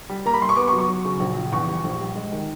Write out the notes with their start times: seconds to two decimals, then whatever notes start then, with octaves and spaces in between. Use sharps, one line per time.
0.10 G3
0.25 A#3 A#5
0.34 B5
0.41 G3 C6
0.49 C#6
0.56 B3 D6
0.68 C#6
0.73 F#3
0.78 C#6
0.88 F#3
1.05 C#3
1.20 A#1
1.36 F3
1.52 E2 C#6
1.68 G3
1.84 A#1
2.01 G3
2.16 G#3
2.32 D#3